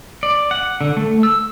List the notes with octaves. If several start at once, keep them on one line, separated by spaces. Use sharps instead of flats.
D5
F#5
D3
A3
E6